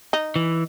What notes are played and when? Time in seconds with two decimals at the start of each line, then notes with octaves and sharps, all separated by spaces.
0.13 D#4
0.36 E3